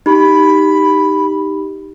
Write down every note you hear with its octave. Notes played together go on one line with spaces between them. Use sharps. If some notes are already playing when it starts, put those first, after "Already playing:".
D#4 G4 B5